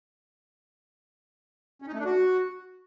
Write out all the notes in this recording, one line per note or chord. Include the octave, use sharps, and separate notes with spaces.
C#4
D#4
A3
D4
F#4